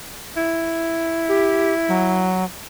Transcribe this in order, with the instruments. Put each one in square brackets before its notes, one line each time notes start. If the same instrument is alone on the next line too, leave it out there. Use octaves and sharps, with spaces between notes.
[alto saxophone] E4
[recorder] G4
F#3